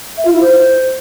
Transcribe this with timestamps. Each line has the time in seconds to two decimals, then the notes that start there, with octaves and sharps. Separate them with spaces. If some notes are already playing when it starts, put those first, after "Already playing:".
0.17 E5
0.25 F4
0.33 E4
0.41 C5